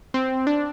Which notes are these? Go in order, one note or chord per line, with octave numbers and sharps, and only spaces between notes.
C4
D4